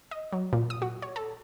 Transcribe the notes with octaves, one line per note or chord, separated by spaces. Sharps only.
D#5
F#3
A#2
D#6
F#4
C#5
A4